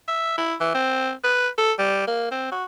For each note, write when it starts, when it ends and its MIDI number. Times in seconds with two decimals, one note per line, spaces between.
0.08 0.37 76
0.38 0.55 64
0.60 0.70 52
0.75 1.11 60
1.24 1.48 71
1.58 1.72 69
1.79 2.03 55
2.07 2.27 58
2.32 2.50 60
2.52 2.65 66